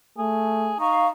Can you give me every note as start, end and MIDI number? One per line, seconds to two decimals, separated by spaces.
0.18 0.75 57
0.18 0.79 68
0.79 1.10 63
0.79 1.08 77
0.79 1.08 85